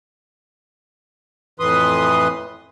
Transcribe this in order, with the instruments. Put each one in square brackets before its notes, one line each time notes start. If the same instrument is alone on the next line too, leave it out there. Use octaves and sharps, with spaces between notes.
[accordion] F2 A2 E3 B4 C6 D#6